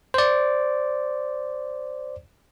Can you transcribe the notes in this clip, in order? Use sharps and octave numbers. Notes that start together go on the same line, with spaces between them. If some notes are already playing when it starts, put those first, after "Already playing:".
C5 D5